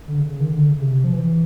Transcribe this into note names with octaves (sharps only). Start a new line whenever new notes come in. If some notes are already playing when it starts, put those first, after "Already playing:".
D3
C#3
D#3
D3
C#3
C3
F3
E3